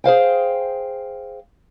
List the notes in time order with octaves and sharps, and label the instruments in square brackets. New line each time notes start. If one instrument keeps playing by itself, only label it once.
[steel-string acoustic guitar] G#4 C5 F5 G5